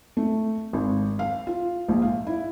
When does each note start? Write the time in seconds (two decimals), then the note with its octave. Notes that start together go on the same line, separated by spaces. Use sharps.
0.17 A3
0.73 G#1
1.19 F5
1.47 F4
1.88 A#1
2.02 F5
2.27 E4